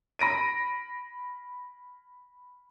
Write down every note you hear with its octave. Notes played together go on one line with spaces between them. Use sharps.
B5 A#6 D7 D#7